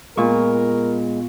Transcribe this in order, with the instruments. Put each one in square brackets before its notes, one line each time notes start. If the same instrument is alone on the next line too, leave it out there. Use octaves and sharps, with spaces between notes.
[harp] A#2 C#6 [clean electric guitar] G#3 [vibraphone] B3 [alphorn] A#4